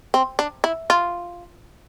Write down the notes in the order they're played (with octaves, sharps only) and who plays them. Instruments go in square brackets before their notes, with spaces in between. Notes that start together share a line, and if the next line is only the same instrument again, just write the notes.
[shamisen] C4
D4
E4
F4